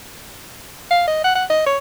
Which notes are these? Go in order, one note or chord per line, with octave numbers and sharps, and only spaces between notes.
F5
D#5
F#5
F#5
D#5
C#5